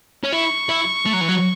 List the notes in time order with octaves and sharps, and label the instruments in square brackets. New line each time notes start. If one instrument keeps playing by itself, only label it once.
[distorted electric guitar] C#4
[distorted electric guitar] E4 [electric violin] C#6
[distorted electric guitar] E4
A3
F#3
E3
F#3